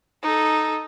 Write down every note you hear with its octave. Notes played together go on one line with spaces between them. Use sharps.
D#4 A4